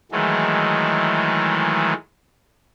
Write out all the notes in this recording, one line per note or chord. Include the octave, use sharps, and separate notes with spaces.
D#3 E3 F#3 G#3 A3